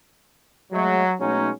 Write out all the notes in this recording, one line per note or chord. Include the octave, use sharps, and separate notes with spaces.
F#3 G#3 A3
B2 F#3 G#3 A3 C#4 D#4